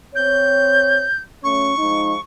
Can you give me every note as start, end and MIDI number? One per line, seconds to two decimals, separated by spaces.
0.15 1.05 60
0.15 1.05 73
0.15 1.19 91
1.43 1.74 54
1.43 1.74 57
1.43 1.74 61
1.43 2.20 85
1.78 2.15 53
1.78 2.15 56
1.78 2.15 63